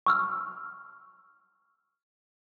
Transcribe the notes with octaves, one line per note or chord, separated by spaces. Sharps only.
C#6 E6 F6